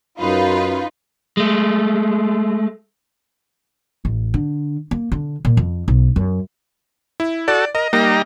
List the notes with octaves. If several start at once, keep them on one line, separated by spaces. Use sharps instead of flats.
F#2 D#4 F4 B4
G#3 A3
A1
D3
A#3
D3
A#2
F2
B1
F#2
E4
F#4 A4 D5
A#4 D#5
G3 A#3 D#4 A#5